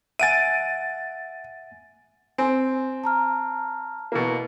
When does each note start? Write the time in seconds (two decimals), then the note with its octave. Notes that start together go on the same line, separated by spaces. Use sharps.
0.20 E5 F#5 G#5 A6 D7 D#7
2.38 C4 G#5
3.04 A5 A#5 F6
4.12 B2 E3 A#3